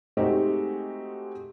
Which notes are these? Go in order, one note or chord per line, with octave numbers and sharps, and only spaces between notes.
G#3 A3 C4 D#4 F#4 G4